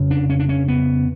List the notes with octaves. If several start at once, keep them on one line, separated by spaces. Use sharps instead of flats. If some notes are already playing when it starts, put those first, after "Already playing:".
Already playing: F2 C#3
D4
C#4
D4
C#4
B3